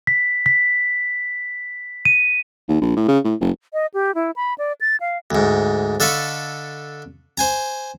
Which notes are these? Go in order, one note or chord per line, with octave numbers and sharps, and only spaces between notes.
B6
B6
D#7
D#2
A#1
A2
C#3
A2
F#1
D#5
G4
E4
B5
D5
A6
F5
D2 G#2
D3 A4 D#5 F5 B5 C#6
C5 G#5 A#5